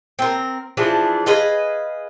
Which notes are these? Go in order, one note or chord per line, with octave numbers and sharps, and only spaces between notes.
C4 A#4
E3 F3 D4 G#4
G#4 B4 D#5 F5